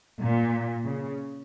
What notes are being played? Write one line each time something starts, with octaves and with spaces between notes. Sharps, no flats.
A#2
C#3